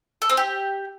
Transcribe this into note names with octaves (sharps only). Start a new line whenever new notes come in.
A4
C4
G4